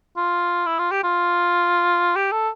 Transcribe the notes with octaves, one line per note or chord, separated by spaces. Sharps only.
F4
E4
F4
G4
F4
G4
A4